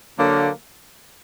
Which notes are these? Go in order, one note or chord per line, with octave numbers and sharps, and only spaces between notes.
D3 F#3 A#3